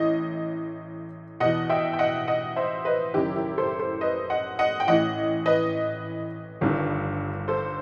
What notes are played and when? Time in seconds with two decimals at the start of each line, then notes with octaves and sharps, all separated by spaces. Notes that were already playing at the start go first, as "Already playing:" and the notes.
Already playing: A1 A2 D#5
1.40 E2 B2 D#5 F#5
1.70 E5 G5
1.93 G5
1.99 D#5 F#5
2.27 D#5 F#5
2.56 C5 E5
2.85 B4 D#5
3.14 F#1 F#2 D#3 E4 G4
3.36 E4
3.58 A4 C5
3.79 A4 C5
4.01 B4 D#5
4.30 D#5 F#5
4.59 D#5 F#5
4.80 G5
4.88 A1 A2 E3 D#5 F#5
5.46 B4 D#5
6.61 G1 G2 D#3
7.48 A4 C5